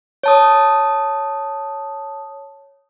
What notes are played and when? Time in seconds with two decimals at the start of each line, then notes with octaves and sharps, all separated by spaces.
0.23 C#5 A5 D#6